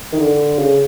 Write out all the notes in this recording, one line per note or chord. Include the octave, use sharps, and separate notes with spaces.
D#3
D3
C#3